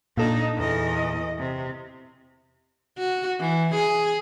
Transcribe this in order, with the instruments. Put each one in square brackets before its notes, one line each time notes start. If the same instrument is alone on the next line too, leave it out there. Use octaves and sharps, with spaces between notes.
[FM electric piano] A#2 A4 [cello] D4 D#4
[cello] E2 D#5
C3
[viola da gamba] F#4
E3
G#4